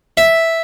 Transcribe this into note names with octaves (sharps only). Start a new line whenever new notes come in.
E5